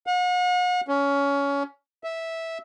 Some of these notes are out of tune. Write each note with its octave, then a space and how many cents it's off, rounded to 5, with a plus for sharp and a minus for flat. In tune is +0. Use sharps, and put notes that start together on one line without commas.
F#5 -45
C#4 +20
E5 -10